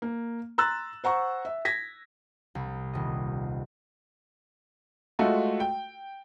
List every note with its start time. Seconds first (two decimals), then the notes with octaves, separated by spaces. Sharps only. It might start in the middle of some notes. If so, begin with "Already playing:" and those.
0.02 A#3
0.58 A#5 C6 E6 F#6 A6
1.04 C5 F#5 A#5 C#6
1.45 E5
1.65 G#6 A#6 B6
2.55 C2
2.93 D#1 D#5
5.19 G#3 A3 F4 F#4 A4
5.60 G5